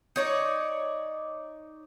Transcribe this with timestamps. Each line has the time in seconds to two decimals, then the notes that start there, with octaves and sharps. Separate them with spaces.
0.16 D#4 C#5 D5